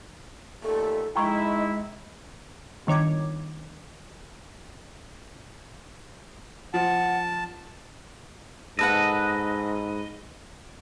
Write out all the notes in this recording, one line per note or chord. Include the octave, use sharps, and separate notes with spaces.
D#2 A#2 A3 A4
G#3 D#4 E4 G5 A#5 C#6
G1 D#3 C#5 D6 G#6
F3 F#5 A5
G#2 A4 B4 D#5 F#5